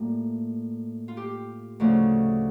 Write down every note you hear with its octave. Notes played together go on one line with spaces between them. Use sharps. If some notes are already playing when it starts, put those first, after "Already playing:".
Already playing: A2 G3 A#3 F4
F4
G4
D2 C#3 F3 A3